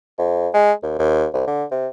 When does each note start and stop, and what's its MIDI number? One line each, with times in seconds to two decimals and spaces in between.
0.19 0.49 41
0.54 0.73 56
0.83 0.96 39
0.99 1.26 39
1.34 1.44 36
1.47 1.64 50
1.71 1.87 48